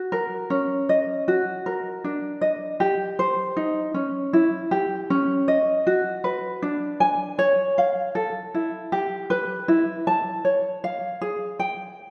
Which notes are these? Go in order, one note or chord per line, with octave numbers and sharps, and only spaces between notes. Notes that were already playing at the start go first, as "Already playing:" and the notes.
Already playing: F#4
A#4
C#4
D#5
F#4
A#4
D4
D#5
G4
C5
D#4
C#4
E4
G4
C#4
D#5
F#4
B4
D4
G#5
C#5
F5
A4
E4
G4
B4
E4
A5
C#5
F5
G#4
G5